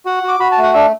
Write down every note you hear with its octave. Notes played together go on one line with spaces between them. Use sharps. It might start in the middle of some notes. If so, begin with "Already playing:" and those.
F#4 F#5
F#4
D6
F#4 B5
A5
A3
F#5
D4 E5